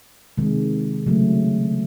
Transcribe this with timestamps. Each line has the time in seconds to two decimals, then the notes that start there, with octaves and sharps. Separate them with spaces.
0.38 C3 D#3 G#3
1.06 C#3 F#3 A3